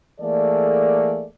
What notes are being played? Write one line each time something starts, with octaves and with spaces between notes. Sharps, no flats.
E3 A3 A#3 G#4 A4 D5